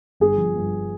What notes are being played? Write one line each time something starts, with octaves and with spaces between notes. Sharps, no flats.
G1 G#4
F3
G2